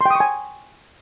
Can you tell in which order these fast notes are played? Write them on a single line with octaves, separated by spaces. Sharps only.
C6 G5 D#6 C#6 G#5